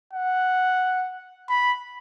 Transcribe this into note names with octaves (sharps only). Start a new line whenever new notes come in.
F#5
B5